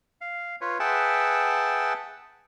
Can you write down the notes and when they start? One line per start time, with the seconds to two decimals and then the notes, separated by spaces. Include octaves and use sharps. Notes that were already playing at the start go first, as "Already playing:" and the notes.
0.21 F5
0.61 F4 B4 C#5
0.80 G#4 B4 E5 F#5 G5 A5